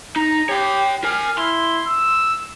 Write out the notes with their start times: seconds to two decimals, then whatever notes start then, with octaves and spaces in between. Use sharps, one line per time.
0.16 D#4 A#5
0.49 G4 C#5 G5
1.04 A#4 G#5 F6
1.38 E4 C6
1.87 E6